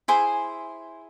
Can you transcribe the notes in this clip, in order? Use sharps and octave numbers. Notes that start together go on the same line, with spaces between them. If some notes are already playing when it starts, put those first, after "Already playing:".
E4 G#4 C5 C6